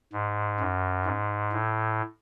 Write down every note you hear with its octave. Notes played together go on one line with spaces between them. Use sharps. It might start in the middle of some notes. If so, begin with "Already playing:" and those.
G#2
F#2
G#2
A2